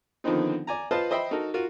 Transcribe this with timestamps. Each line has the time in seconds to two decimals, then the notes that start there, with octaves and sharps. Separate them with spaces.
0.24 D3 D#3 F3 B3 C4 D#4
0.67 D5 G#5 A#5
0.91 F4 B4 C5 D#5 F5 A5
1.11 C5 D#5 E5 G5 B5 C6
1.31 D#4 F#4 A4 A#4
1.54 F4 F#4 A#4